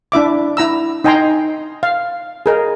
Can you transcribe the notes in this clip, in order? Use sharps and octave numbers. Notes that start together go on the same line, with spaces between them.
D4 E4 E5 D6
E4 A#5 E6
D#4 D#5 G5 G#5 A#5 C6
F5
G#4 A#4 D#5